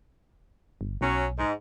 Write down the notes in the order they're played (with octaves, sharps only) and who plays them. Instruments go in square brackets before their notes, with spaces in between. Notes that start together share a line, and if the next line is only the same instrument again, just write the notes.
[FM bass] G1
[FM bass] B1 [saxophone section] F#3 C#4
[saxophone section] G#2